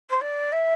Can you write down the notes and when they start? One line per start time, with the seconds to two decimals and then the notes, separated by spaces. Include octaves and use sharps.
0.10 C5
0.21 D5
0.52 E5